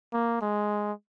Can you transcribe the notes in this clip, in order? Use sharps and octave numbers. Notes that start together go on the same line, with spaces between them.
A#3
G#3